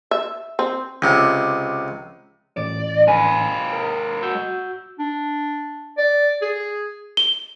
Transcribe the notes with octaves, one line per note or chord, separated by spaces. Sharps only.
E5
C4
C#2 C3
A1 D5
G#3 B4 G#5
A#4
F#4 E6 G6
D4
D5
G#4
G7